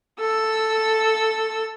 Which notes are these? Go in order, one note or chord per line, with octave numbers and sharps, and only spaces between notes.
A4 E6